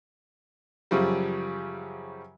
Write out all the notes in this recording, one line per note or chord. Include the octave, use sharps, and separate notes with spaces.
F#2 C#3 F3 G3